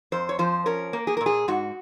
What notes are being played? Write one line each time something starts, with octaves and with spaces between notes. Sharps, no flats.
F2 C5
C#5
F3 C5
C#4 A#4
A#3
G#4
A#4
A#2
G#4
G#2 F#4